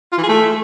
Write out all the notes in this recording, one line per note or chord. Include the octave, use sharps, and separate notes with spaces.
F4
E3
G#4
A3